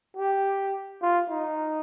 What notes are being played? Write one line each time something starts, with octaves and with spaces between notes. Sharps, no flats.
G4
F4
D#4